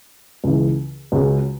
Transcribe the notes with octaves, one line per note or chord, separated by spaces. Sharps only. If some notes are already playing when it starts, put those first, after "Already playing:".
C#2 C#3 E3
C#2 C#3 G#3 C#4 F#4